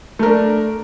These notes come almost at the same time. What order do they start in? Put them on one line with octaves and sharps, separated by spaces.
A3 A#4 D4